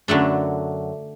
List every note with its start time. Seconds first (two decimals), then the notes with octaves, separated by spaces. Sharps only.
0.08 F#2 D3 F#3 A3 D4